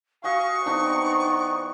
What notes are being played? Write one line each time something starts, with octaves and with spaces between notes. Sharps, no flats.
F#4 D#5 F5 G#5 C#6
E3 B3 C4 D4 D#4